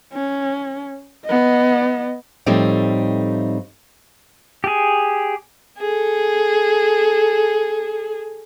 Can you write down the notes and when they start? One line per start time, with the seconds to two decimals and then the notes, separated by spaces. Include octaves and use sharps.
0.13 C#4
1.25 B3 D#5
2.46 A2 F3 G3 A3 C4 D#4
4.64 G4 G#4
5.78 G#4 A4